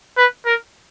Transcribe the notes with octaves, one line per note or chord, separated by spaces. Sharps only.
B4
A#4